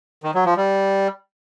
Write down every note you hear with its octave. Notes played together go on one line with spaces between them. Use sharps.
D#3
F#3
F3
G3